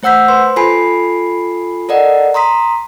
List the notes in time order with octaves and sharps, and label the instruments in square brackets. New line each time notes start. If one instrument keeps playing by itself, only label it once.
[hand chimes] A3 C5 F#5 E6 G6 B6
B4 C5 C6
F4 A4 G#5 B5 C7
A4 A#4 D5 D#5 F#5
A#5 C6 D#6 B6